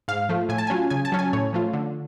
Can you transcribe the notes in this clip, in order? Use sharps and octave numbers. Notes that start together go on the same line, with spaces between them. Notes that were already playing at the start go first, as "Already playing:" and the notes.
G#2 F5
F3 A3
A2 G#5
A5
F#3 C#4 F4 G#5
C#3 G#5
A5
F#3 C#4
G#5
A2 C#5
F3 A3 F4
D3